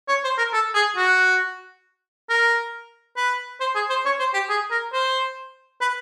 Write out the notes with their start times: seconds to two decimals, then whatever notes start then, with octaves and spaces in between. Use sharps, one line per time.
0.08 C#5
0.24 C5
0.38 A#4
0.53 A4
0.74 G#4
0.96 F#4
2.29 A#4
3.17 B4
3.60 C5
3.75 G#4
3.90 C5
4.05 C#5
4.19 C5
4.33 G4
4.49 G#4
4.71 A#4
4.93 C5
5.81 B4